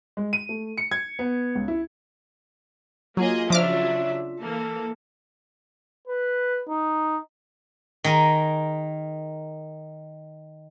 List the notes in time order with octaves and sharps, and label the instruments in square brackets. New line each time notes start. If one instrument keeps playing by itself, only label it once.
[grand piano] G#3
D#7
A3
C#7
G#6
B3
C#2
E4
[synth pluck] F#3 [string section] A#3 G#4 D#5 [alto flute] F4
[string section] C#3 F#3 D4 [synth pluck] F3 D6 F6 [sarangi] E5
[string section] E3 A#3 [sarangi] A4
[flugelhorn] B4
D#4
[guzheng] D#3 G#4 A#4 G#5